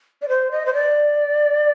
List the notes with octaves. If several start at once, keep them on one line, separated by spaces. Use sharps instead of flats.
D5
C5
D#5
C5
D5